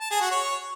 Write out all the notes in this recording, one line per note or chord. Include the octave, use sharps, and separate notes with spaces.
A5
G#4
F#4
C#5